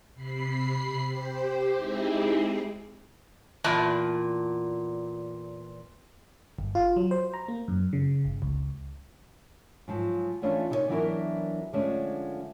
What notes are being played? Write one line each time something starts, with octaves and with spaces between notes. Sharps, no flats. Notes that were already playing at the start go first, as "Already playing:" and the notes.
C3 B5 C7
G4 C5
G#3 C4 D#4 E4 G4 G#4
E2 A#2 A5
G1
F4
F#3
C5
A#5
A#3
F#2
C#3
G1
C#2
G#2 F3 F#3
E3 A3 C#4 D4 F4
C3 D#4 A4 C5 C#5 G#5
E3 F#3 B3 D4 E4 A#4
D3 F3 G#3 A3 C#4 D4